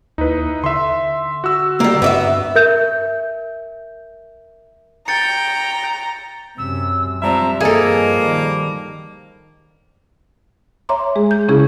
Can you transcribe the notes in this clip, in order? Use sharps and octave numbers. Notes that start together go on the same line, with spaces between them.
D#2 D#4 E4 B4
D3 E5 C6
F#4 E6
G3 A#3
G2 B3 D5 E5
A#4 E5 G6
G5 A#5 A6 C#7
F#2 C3 E6
F3 G3 C4 D4 E5 A#5
G2 F3 A#3 G#4 A4 D#5
D#3 G3
C#5 E5 A#5 C6 D6
G#3 G#4
G6
C#3 C#4 E4 G#4